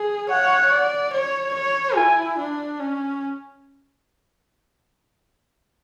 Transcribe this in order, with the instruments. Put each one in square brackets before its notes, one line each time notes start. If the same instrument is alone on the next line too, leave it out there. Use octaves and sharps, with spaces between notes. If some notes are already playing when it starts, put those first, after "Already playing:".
Already playing: [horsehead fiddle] G#4
[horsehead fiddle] C#5 [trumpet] F#5
[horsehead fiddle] D5
C#5
C#5
[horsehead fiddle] E4 [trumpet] G#5
[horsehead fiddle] D4
C#4